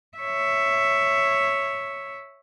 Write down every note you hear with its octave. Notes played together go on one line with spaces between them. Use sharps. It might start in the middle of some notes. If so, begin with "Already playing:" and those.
C#5 E5